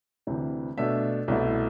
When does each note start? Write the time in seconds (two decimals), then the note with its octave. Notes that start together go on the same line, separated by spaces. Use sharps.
0.27 D2 C3 E3
0.78 B2 A3 D4 E5
1.28 C2 B2 A3 E4